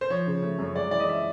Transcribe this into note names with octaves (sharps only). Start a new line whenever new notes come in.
C5
F3 C#5
C#3
A3
F#2
G#3 D5
E3 D5
D#5
E5